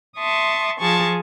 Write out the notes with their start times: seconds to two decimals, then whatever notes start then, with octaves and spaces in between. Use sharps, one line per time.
0.18 E5 A5 C6 C#6 D#6
0.79 F3 F4 G#4 A5 C#6